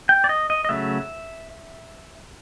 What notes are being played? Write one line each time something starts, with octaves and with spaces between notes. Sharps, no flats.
G5
D5
D#5
D#5
D#5
C#3 F#3 A3 E5